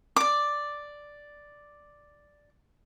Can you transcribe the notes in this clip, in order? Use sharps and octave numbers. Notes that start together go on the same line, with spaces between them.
D5 D6